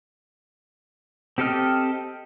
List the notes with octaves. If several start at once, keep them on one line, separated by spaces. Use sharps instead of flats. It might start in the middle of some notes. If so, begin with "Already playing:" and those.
C4 G4 A4 D#5 F6